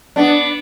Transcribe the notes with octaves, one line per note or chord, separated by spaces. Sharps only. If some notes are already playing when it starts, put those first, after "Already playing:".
B3 D4